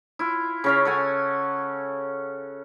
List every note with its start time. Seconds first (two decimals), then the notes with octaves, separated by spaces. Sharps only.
0.19 E4 F4
0.64 C#3 C#4 F5
0.85 A4 F#5 G#5